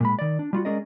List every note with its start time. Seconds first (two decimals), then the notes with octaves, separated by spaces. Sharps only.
0.01 A#2 G#3 B5
0.19 D#3 D5
0.39 D4
0.53 G3 F4 F#4
0.65 G#3 C#4 G#4 A#4 D5 D#5